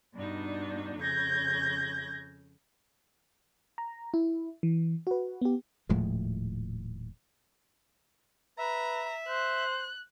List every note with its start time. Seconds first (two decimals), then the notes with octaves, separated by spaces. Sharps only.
0.15 G2 B2 D4 D#4
0.98 F2 C#3 G6 G#6 A#6
3.78 A#5
4.14 E4
4.63 E3
5.07 F#4 B4
5.42 B3 G4
5.89 D#1 A2 F3 G#3
8.59 B4 E5 A#5
9.28 C5 F#6